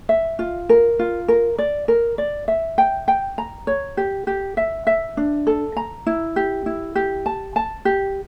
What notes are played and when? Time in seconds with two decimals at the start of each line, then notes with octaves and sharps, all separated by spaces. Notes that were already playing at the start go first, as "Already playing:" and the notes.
0.09 E5
0.39 F4
0.69 A#4
0.99 F4
1.28 A#4
1.58 D5
1.88 A#4
2.18 D5
2.48 E5
2.78 G5
3.08 G5
3.38 A#5
3.67 C#5
3.97 G4
4.27 G4
4.57 E5
4.87 E5
5.17 D4
5.47 A4
5.77 A#5
6.07 E4
6.36 G4
6.66 E4
6.95 G4
7.26 A5
7.56 A5
7.85 G4